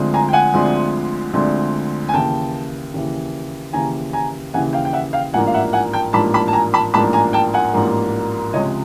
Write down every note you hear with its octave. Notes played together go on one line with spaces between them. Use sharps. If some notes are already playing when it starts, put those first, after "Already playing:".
Already playing: D2 D3 F3 G#3 C4
G#5 A#5
G5
F#5 G#5
D2 D3 F3 G#3 C4
D2 D3 F3 G#3 C4
G#5
D#2 C#3 E3 G5 A5
D#2 C#3 E3
D#2 C#3 E3 G#5 A#5
G#5 A#5
D#2 C#3 E3 F#5 G#5
F5 G5
G5
E5 F#5
F5 G5
A1 G#2 F3 A#3 D4 F#5 G#5
F5
E5 F#5
F#5 G#5
G5 A5
A1 G#2 F3 A#3 D4 A5 B5
A5 B5
A5
G#5 A#5
A5 B5
A1 G#2 F3 A#3 D4 A5 B5
G#5 A#5
G5 A5
F#5 G#5
A1 G#2 F3 A#3 D4
C#2 C3 F3 G#3 C#5 D#5